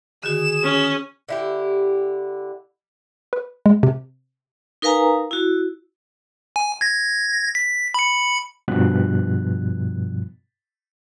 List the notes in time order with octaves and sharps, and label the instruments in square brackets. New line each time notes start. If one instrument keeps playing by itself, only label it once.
[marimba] D3 D#3 F#4 [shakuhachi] G#4 [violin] E7
[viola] C#4
[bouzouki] D3 E4 G4
[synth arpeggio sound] B4
G#3
C3
[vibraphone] D#4 A#4 B4 F5 G#5 A#5
E4 F#4
[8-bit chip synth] G#5
G#6 A#6
B6
B5 C#7
[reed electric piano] G2 B2 F3 F#6